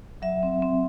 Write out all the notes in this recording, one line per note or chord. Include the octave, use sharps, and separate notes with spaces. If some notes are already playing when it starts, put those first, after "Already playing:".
F#3 E5
C4
C4